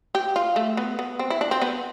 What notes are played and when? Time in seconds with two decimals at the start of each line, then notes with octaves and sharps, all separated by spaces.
0.15 G4
0.36 F4
0.56 A3
0.77 B3
0.99 B3
1.19 C4
1.30 E4
1.41 D4
1.51 C4
1.62 B3